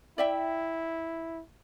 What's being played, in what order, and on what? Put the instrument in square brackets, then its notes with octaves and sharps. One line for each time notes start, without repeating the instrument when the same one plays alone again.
[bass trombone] E4 [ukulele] D5 E5 G5